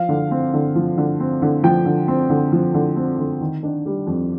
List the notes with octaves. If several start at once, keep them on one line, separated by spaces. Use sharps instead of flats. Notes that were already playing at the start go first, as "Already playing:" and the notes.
Already playing: F3 F5
D3
C4
D3
F3
D3
C4
D3
F3 G5
D3
C4
D3
F3
D3
C4
D3
D#3
D4
G3
F2